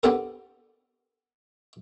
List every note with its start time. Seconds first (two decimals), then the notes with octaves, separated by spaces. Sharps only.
0.03 B3 C4 D4 G4 A4 A#4